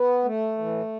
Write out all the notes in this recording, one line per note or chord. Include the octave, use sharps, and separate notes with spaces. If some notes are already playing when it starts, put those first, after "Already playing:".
Already playing: B3
A3
A2 E3